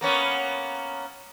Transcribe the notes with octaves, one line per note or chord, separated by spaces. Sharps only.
A#3 B3 C#4